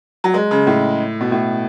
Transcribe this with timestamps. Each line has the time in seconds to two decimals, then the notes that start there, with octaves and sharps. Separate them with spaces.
0.24 F#3
0.34 G#3
0.51 C#3
0.67 A2
1.21 B2
1.32 A2